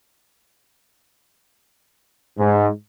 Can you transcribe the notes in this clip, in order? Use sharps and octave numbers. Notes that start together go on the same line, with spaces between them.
G#2